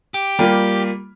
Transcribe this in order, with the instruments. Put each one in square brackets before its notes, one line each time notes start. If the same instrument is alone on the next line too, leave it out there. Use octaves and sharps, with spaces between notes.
[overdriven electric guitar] G4
[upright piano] G3 A#3 F4